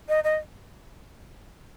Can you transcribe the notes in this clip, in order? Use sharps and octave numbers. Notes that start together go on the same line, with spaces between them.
D#5
D#5